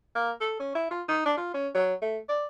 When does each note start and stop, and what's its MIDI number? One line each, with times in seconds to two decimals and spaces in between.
0.15 0.31 58
0.41 0.57 69
0.59 0.71 61
0.75 0.86 64
0.91 1.02 65
1.08 1.23 63
1.25 1.33 62
1.37 1.50 65
1.54 1.68 61
1.75 1.94 54
2.02 2.19 57
2.29 2.46 74